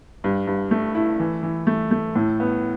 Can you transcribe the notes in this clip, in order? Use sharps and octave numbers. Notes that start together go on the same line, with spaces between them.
G2
G2
A3
E4
E3
E3
A3
A3
A2
B3